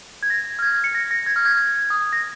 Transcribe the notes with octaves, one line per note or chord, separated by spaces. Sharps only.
G#6
A#6
F6
G#6
C#7
A#6
A#6
G#6
F6
G#6
D#6
A#6